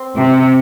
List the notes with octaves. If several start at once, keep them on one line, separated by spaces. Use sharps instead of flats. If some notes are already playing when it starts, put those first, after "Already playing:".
Already playing: C4
C3